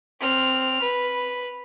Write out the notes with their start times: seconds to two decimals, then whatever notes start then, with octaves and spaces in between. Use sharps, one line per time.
0.20 C4 F6
0.82 B4